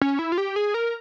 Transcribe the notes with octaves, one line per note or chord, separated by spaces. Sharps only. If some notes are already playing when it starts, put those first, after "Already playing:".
C#4
E4
F4
G4
G#4
A#4